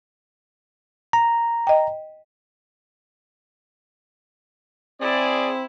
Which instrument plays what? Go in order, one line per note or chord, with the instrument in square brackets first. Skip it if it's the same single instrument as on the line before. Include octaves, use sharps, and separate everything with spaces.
[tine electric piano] A#5
[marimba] D#5 G5
[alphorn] C4 [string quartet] E4 [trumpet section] G#4 D5